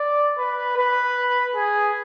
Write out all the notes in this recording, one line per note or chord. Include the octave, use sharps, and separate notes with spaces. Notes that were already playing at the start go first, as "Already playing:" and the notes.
Already playing: D5
B4
B4
G#4